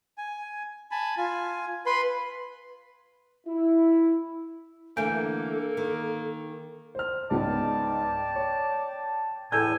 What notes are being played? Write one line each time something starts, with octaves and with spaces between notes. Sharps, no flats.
G#5
G#5 A5 B5
F4 G#5
B4 B5 C6
E4
D3 E3 A3 A#3 A4 G#5 G6 D7
D#3
C5 F6
C#2 G#2 B3 D5 G5 A5
C#5
E2 A2 A4 G#5 E6 G6